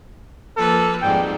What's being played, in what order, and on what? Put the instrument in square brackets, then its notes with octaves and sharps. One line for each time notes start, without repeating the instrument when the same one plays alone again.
[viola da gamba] F3 A#3 B4 [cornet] A4
[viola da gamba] F2 G#2 G3 [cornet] G5